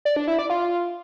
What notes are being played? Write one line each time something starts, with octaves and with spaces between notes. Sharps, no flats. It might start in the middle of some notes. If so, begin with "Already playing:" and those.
D5
D4
E4
D5
F4